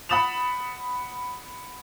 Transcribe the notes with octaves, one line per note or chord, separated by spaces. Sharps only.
F#5 B5 D#6 A6 E7 F7